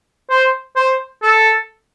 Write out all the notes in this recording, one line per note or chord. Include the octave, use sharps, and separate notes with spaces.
C5
C5
A4